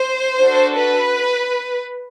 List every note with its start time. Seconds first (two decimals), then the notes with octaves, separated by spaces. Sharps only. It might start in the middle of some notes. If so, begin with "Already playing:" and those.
Already playing: C5
0.42 D4 F#4 A4
0.78 B4